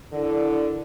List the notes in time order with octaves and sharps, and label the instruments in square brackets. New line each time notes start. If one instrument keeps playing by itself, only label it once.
[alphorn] D3 [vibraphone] E4 A#4 D5